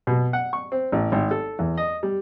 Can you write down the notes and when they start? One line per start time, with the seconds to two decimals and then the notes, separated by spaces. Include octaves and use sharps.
0.07 B2
0.33 F#5
0.53 C#6
0.72 C4
0.92 A1
1.12 G#1
1.31 A4
1.59 E2
1.77 D#5
2.03 G3